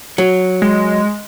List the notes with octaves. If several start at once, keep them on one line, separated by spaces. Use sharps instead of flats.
F#3
G#3